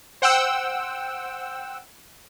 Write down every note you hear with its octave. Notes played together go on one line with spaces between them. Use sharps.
C5 F#5 G5 E6